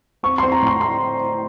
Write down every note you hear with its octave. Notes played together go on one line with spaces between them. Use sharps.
C4 C#6
C4 C6
A#5
A2 C6
A3 C6